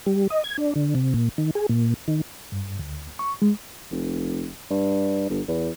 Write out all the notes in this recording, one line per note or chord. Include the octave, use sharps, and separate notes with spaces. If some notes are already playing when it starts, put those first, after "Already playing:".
G3
D#5
G#6
D4
D3
C3
A#2
D#3
G#4
A#2
D#3
G2
D2
C#6
G#3
F1
G2
G1
E2